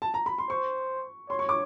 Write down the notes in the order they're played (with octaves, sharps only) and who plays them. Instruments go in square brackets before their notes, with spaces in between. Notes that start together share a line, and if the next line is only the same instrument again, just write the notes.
[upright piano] A5
A#5
B5
C6
[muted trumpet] C5 [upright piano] C#6
[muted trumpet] C#5 [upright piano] C6
[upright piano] C#6
D6